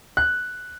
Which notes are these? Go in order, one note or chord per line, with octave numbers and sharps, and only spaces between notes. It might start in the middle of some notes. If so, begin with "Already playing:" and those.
F#6